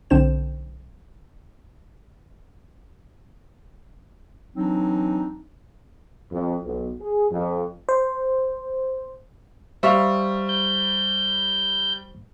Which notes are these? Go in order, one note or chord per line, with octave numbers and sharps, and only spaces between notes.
B1 D3 C4 D4 C5 E7
E3 F#3 C4 D4 D#4
F2
B1
G#4
F2
C5
G3 C5 E5 F5 C#6
G6